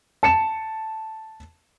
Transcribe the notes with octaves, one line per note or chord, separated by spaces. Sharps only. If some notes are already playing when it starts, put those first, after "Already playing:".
A5 C#7 E7